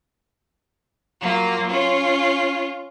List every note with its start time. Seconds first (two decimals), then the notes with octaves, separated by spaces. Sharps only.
1.21 F#3 A#3 F4
1.68 C#4 F4